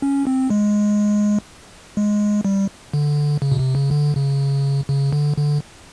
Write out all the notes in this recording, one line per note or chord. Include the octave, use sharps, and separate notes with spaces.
C#4
C4
G#3
G#3
G3
D3
C#3
B2
C3
C#3
D3
C#3
C#3
D3
D3